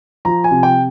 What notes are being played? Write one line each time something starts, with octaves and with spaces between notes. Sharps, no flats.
F3 A#5
G#5
C3
G5